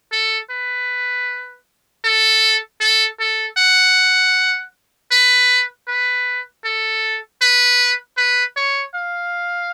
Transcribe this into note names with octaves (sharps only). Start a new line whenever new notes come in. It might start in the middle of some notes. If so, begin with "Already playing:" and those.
A4
B4
A4
A4
A4
F#5
B4
B4
A4
B4
B4
C#5
F5